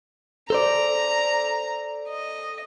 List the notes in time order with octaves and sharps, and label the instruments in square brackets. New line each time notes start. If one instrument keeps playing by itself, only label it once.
[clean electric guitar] A4 C5 D5 [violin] A#5
[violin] D#5